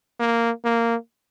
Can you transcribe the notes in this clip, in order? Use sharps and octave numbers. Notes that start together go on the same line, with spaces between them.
A#3
A#3